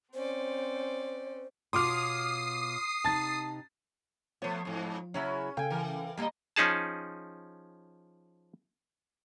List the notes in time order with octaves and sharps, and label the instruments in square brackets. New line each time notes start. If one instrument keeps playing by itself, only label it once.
[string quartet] C4 C#4 D5 [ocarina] C5
[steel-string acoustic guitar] B2 F4 C#5 [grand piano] C6 D6 F6 [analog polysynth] D#6 C7
[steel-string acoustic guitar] C3 D#4 [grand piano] A5 A6
[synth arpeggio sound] F3 [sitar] A3 B3 [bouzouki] C5 C#5
[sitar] F2 G#2
[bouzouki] C#3 F#3 E4 [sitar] C#4
[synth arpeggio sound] C#3 A4 F5 [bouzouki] G5 G#5
[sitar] E3 A#4
[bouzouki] D#3 A#3 A4 [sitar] G3 D#5
[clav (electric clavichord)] F3 C#4 D#4 G#4 A5